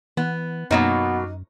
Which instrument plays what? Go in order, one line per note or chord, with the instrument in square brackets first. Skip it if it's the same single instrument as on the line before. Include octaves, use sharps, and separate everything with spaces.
[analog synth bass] E3 [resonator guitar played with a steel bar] B3
[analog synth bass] F#2 [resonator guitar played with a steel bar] B2 F#3 A#3 [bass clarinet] B3 [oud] D#4